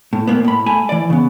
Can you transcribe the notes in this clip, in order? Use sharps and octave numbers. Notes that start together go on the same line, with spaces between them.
A2
A#2 A#3 B3
A2 B5
A3 G#5 B5
E3 D5
C#3 B3